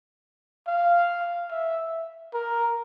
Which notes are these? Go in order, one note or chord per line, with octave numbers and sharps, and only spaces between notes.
F5
E5
A#4